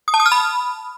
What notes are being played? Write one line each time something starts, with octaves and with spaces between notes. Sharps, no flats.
D#6
A5
D#6
F6
B5